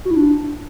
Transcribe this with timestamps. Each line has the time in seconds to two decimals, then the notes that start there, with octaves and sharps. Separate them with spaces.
0.05 F#4
0.11 E4
0.16 D4